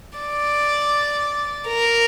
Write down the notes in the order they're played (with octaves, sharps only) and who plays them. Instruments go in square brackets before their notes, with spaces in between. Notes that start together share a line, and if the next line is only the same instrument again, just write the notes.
[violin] D5
A#4